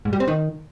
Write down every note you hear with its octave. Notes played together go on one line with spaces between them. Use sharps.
G#2
G3
C4
D#3